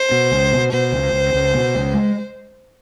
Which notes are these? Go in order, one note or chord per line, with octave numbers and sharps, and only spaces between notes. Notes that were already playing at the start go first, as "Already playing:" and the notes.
Already playing: C5
B2
C#2
B2
B2 C5
C#2
C#2
C#2
B2
C#2
G#3